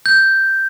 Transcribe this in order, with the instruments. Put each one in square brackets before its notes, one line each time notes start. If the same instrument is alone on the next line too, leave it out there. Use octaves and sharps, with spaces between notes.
[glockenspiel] G6